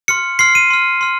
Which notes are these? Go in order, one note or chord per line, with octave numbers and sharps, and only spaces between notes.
C6 F6 C#7
C6 F6 C7
D#7
C6 F6
C6 F6